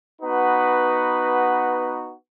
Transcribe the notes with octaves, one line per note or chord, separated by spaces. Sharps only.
B3 D#4 F#4 B4